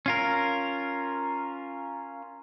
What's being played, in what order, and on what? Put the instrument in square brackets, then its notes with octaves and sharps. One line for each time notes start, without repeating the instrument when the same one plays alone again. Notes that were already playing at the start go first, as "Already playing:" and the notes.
[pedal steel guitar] C#4 F4 A#4